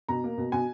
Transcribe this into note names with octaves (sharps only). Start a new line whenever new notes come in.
B2 A#5
A#3
B2
B2 G#5